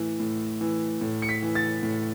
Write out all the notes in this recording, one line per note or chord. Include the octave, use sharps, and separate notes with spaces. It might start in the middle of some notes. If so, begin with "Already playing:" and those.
Already playing: A2 E3
A2
E3
A2
C#7
B6
E3
A6
A2